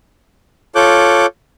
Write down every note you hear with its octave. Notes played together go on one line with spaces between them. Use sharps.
F4 A4 C#5 D6 F#6 G6